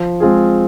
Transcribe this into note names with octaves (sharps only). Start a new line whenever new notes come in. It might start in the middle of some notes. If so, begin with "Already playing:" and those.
Already playing: F3
G#3 C4 F4 G#4